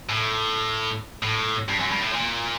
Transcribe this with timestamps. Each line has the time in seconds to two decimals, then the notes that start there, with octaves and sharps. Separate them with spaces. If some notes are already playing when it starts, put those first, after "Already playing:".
0.09 A2
1.23 A2
1.68 G2
1.80 F#2
1.91 G2
2.01 A2
2.13 A#2